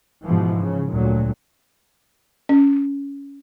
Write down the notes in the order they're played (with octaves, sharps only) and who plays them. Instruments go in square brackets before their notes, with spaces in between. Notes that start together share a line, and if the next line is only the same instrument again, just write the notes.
[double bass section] G#2 B2 E3 F3
C#3
D2 A#2 F#3
[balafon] C#4